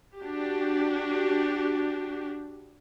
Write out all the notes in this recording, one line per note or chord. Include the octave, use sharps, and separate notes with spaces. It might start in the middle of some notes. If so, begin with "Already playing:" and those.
D4 F#4 G4